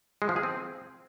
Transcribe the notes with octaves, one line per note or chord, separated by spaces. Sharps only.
G#3
F3
G#4
C4